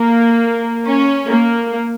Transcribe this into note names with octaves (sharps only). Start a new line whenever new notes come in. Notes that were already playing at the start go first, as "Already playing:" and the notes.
Already playing: A#3
C#4
A#3